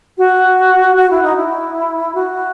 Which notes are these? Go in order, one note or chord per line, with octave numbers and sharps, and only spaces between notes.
F#4
F#4
E4
D#4
E4
F#4